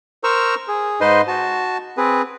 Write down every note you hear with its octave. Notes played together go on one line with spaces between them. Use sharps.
A#4 C5 A#5 C#6 E6
G#4
G#2 D#4 B4 C5 D#5 C6
F#4 A5
C4 G#4 B4